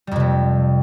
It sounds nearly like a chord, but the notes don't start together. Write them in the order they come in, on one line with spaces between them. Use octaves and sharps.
G3 F2 C3 A3